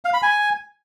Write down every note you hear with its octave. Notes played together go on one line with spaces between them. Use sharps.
F5
B5
G#5